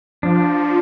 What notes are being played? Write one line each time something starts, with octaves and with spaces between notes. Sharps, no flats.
F3 D4